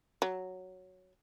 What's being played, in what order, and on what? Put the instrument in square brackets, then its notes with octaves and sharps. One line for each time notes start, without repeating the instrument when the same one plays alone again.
[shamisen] F#3